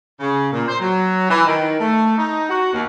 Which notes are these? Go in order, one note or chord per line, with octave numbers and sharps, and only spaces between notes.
C#3
A#2
C5
F#3
E3
D#3
A3
D#4
F#4
D#2